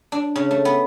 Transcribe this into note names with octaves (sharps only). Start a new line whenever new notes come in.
D4
C#3
A3
B3